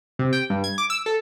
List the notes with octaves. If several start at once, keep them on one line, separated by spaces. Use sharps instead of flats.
C3
G5
G2
G#6
D6
E6
A4